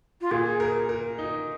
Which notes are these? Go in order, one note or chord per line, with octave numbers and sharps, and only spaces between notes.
F4
A#2 G#4
A#4
A#4
D#4